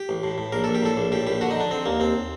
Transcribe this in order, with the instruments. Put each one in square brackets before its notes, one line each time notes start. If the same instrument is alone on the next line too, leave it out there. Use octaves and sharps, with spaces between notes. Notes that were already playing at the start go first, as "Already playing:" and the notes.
Already playing: [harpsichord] G4
A1
A2
A2
A#1 A#4
A#1 A4
G4
A2 A4
A#1
A2 G4
A#1 G4
D3 F#4
D#4
D3 D4
D3 C4
D#2 A#3
D#2 C4